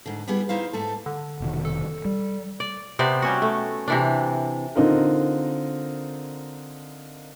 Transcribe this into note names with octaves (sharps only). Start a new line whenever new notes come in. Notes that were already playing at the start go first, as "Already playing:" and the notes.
G#2 D3
G3 B3 E4 G4 G#4
D#4 E4 C5 F5
G#2 A3 A4
D3
F1 B2 D#3
A4
G3
D5
C3 B3 C5 D5
G3 C#4 F#4
A3
C3 E3 D4
D3 C4 D#4 F4 A#4